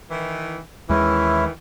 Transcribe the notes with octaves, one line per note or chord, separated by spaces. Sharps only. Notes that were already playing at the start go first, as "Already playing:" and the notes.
D#3 E3
D#2 D#3 E3 G#3 C#4 E4